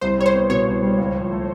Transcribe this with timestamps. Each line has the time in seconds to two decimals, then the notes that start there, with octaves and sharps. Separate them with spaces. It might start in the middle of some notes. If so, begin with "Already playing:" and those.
0.01 C2 C5
0.18 G3 C#5
0.26 C5
0.34 B3
0.50 B2 C#5
0.66 C2
0.82 G3
0.98 C#2
1.15 F3
1.31 A3